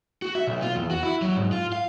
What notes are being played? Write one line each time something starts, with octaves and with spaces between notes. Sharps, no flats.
F#4
E5
B1
F4
E2
F#4
E4
F#3
G#2
F4
F5